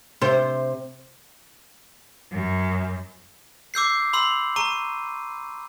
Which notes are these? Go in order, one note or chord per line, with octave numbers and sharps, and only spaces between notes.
C3 C5
F#2
D6 E6 G6 C7
B5 C6 E6
A#5 C#6 D#7